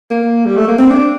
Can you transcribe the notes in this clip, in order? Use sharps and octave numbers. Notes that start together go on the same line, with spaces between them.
A#3
G3
A3
A#3
C4
D4